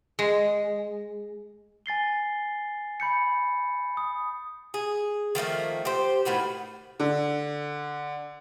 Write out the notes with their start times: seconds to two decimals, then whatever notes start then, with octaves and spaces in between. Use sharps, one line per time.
0.19 G#3
1.86 G#5 A6 C7 G7
3.00 B5 G6 C#7
3.97 D#6
4.74 G#4
5.35 D#3 F3 A3 A#3
5.85 G4 C5
6.25 A2 D#3 B3 F#4
7.00 D3